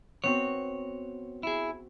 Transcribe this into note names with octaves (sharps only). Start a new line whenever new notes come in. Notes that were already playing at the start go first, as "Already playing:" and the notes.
B3 C4 F#4 C#5
E4 G#4